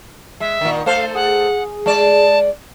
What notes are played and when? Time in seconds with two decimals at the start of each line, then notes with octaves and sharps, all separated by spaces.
0.40 G#3 E5
0.61 A#2 D#3
0.86 A3 A4 C5 F5
1.15 G#4 F#5
1.86 G#3 D5 A5